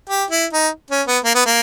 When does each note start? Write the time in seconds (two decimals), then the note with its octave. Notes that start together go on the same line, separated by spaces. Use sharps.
0.09 G4
0.31 E4
0.53 D#4
0.91 C#4
1.07 B3
1.24 A#3
1.35 B3
1.46 A#3